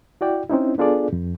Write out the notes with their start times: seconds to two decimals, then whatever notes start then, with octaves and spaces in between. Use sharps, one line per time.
0.21 E4 F#4 D5 G5
0.49 C4 C#4 D#4 E4
0.78 B3 D4 F4 G#4 A4 D5
1.13 F2